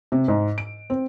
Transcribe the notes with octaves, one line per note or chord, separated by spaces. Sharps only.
C3
G#2
D7
C4